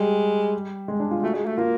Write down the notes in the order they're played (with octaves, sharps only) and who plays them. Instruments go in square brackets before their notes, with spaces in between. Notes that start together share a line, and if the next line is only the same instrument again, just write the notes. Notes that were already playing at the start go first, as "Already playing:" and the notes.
Already playing: [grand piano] G3 [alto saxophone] G#3
[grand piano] G#3
D4
F4
[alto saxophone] A3 [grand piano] F#4
[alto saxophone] G#3
A3
[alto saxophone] A#3 [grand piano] F4